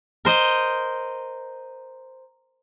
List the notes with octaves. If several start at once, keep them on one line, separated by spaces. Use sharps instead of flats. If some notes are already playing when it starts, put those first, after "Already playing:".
A#4 C5 D#5